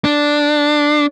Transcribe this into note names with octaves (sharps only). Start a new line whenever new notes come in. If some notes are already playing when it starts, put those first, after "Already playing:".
D4